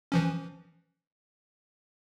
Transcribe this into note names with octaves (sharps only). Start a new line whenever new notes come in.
E3 F3 C#4